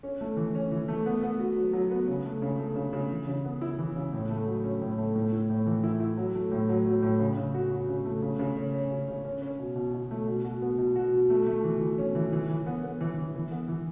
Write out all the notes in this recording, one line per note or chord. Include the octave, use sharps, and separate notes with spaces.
C#4
A3
E3
C#4
E3
A3
B3
B3
F#4
F#3
F#3
B3
C#3
A3
C#3
A3
C#3
C#3
E3
C#3
B3
E4
E3
C#3
A2
A3
F#3
C#4
A2
A3
A2
E4
A2
E3
E4
E4
F#3
A3
A2
F#3
F#3
A2
C#3
C#3
F#4
F#4
C#3
A3
C#3
C#3
C#4
C#4
C#3
C#3
C#4
C#4
B2
B2
B2
A3
B2
F#4
B3
B2
F#4
B2
A3
A3
E3
E3
C#4
E3
E3
E3
B3
B3
E3
E3
E3
B3
E3